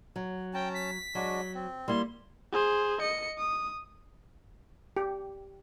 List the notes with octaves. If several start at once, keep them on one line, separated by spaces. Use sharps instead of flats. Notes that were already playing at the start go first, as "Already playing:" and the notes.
F#3
C#4 G5 A5 A#5
B6
F#3 G#3 D4 F#4
C4
G3 A#3 E4 C6
G#4 C5
D#5 C#7
D#6
G4